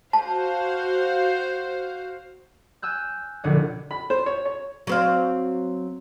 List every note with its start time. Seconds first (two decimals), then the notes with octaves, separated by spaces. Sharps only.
0.13 F#4 C5 F5 A5
2.82 G#5 E6 F#6 G6
3.44 E1 A#1 D3 C#4 D4
3.91 B5
4.10 C5
4.26 C#5
4.46 C#5
4.87 F#3 C4 F5